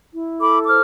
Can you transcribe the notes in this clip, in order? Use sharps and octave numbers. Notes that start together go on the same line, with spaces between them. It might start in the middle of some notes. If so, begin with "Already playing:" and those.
E4
A4 B5 D6
C5 D6 F6